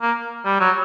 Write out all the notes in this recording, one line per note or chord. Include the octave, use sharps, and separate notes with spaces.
A#3
G3
F#3